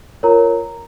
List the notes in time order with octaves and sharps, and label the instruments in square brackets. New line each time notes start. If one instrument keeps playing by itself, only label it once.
[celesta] F4 A#4 C#5 A#5